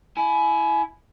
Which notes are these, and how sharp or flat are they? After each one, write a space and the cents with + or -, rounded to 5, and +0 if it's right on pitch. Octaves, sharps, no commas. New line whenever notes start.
E4 +0 G#5 +30